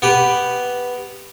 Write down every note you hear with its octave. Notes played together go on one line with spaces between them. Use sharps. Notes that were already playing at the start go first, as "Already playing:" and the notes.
B3 G4 B4